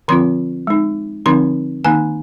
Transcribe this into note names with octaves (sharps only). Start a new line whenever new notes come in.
D3 F3 C4 F4 C6
G#3 D#4
D3 F3 C4 D#4 C6
D#3 A#3 D#4 G#5